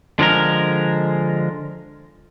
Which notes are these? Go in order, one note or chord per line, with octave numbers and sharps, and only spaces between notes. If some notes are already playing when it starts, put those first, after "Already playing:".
D3 F3 G#3 A#4